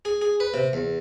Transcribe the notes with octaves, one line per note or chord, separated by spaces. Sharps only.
G#4
G#4
B4
C3
E2